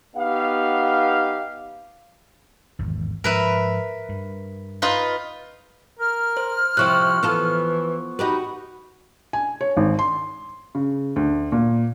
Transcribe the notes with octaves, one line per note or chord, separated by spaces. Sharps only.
B3 D#4 G4 F5
G#1 E2
G#2 F3 A#4 B4 E5
G2
D#4 F4 B4
A#4 F6
C5
C3 F3 C4 E4 C5 C#6 F#6
E3 B3 F4 A4
D#4 F#4 G4 B4
G#5
C#5
G#1
C6
C#3
D2
A#2